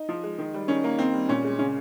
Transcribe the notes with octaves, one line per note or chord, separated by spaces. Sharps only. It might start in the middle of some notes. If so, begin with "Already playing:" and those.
Already playing: D#4
F3
G#3
D#3
G3
D#3 C#4
A#3
D#3 C4
G3
A#2 C#4
G#3
C#3 C#4